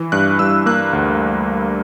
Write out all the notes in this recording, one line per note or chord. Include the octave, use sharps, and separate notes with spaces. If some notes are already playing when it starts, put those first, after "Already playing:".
Already playing: E3
G2 F#6
G2 E6
A#3 F#6
D2